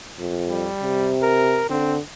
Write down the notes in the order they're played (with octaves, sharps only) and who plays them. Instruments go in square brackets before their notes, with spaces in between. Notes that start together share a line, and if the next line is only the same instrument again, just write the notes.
[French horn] F2
[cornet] G3
[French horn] C3
[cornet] A#4
[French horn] D3 [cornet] C4